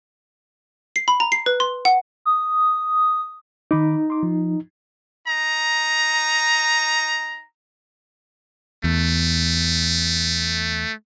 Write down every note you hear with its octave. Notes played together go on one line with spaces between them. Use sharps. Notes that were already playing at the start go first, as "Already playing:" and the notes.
C7
B5
A#5
C7
B4
C6
F#5
D#6
D#3 D#4 B5 D6
C6 D6
F3
D#4 A#5
E2 A3